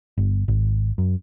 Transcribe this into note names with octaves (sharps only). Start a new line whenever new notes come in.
G1
G#1
F#2